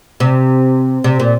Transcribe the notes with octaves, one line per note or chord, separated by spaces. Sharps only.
C3
C3
A#2